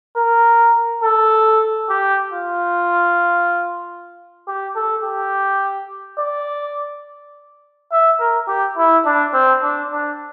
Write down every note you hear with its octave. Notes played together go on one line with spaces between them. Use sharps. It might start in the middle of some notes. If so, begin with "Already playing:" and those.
A#4
A4
G4
F4
G4
A4
G4
D5
E5
A#4
G4
E4
D4
C4
D4
D4